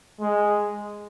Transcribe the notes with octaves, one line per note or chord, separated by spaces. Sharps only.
G#3